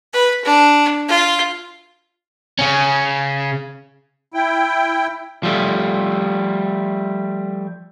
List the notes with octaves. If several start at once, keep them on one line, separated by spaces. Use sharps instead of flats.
B4
D4
F4
C#3 C#4
E4 G5
F3 G3 A3